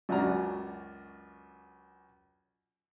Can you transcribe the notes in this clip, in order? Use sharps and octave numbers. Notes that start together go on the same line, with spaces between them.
C#2 F#2 D4 F#4 A#5